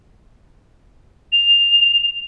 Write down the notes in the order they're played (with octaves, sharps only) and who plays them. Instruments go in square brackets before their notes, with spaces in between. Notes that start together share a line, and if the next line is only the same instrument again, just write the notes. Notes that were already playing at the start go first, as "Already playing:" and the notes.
[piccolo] F7